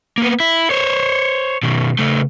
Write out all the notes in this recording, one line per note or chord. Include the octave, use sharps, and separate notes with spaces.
A#3 B3
E4
C5 C#5
B2 D#3
C#3 A3